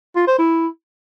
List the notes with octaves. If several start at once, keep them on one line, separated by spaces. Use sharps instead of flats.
F4
C5
E4